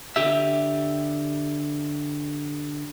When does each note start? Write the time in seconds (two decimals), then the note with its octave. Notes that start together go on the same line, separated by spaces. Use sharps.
0.16 D3 G4 E5